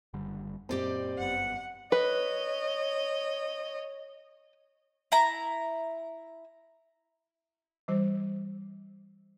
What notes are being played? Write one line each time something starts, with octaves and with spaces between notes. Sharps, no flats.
F#1 D3 G3
F#2 A#2 C4 G4 D5 D#5
G1 F#2 B3 F#5
B4 C#5 D#5
E4 A#5
E3 G3 C5